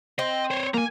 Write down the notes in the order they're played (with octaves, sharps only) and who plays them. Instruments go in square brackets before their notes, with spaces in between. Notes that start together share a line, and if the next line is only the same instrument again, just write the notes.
[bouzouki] C4 [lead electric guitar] D#5
[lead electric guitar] C5 C#5
[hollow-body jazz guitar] A#3 [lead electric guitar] G#5 A#5